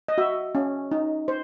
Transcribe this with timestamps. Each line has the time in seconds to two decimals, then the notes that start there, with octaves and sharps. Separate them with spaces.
0.08 D#5
0.18 F#4 E5
0.55 C#4
0.91 D#4
1.28 C5